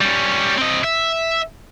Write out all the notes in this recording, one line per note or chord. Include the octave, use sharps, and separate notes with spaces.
G3 C#4
C4 D#5
E5